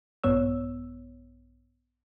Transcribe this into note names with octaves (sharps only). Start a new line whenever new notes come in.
A#1 G2 B3 C#5 E6